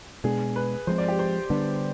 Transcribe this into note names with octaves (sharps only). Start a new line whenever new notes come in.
B2 G#3 B3 D4 G#4
B4
F3 G#3 C4 C5
D5
G4
C5
D3 G3 B3 D4